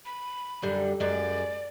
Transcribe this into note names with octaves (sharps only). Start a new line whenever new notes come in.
B5
F#2 D3 G3
F#2 G#3 D5